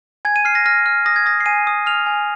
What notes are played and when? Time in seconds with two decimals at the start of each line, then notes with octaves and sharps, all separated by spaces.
0.25 G#5 G#6
0.36 D#7
0.45 F6 C7
0.55 A#6
0.66 F6 A#6
0.86 F6
1.06 D#6 A#6
1.16 G#6
1.26 D#6 A#6
1.40 C7
1.46 G#5 D#7
1.67 D#6
1.86 F6 F7
2.07 G#5